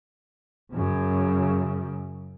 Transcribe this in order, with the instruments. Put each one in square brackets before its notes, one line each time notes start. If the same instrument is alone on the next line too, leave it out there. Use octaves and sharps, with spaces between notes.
[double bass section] F#2 C#3